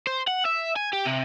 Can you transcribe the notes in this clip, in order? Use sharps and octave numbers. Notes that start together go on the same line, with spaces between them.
C5
F#5
E5
G#5
G4
C3